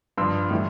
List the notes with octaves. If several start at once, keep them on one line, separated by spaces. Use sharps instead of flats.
G2 F3 C6 E6
A2 E3 G3